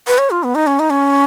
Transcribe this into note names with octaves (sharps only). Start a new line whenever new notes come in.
B4
C#5
F4
B3
D#4
C#4
D#4
C#4